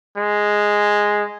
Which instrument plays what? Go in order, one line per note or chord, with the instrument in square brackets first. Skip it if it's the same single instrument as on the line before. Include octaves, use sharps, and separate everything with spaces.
[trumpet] G#3